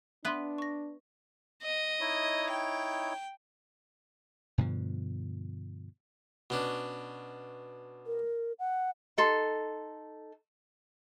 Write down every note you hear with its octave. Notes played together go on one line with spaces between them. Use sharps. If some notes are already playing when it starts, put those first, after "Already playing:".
B3 D4 B4 E5 C6
C#6 A#6
D#5
D#4 E4 C#5
G5
G2 B2 D3 F3
B2 C#4 D4
A#4
F#5
D#4 A4 C6